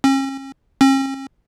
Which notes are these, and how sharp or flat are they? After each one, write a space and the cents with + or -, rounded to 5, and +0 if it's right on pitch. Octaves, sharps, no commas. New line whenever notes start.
C#4 -40
C#4 -45